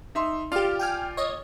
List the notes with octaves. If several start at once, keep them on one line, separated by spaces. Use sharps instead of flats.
D#4 E5 C6
F4 G4 D5 F6
G5 G#5 F6
C#5 D#5